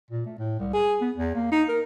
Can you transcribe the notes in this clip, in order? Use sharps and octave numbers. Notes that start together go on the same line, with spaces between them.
A#2
A3
A2
C2
G#4
B3
E2
A#3
D#4
A#4